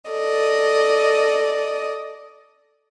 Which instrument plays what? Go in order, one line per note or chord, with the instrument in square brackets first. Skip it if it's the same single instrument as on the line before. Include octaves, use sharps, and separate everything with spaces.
[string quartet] A4 D5 D#5